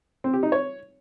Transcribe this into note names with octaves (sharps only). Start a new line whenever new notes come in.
C4
G4
D#4
C#5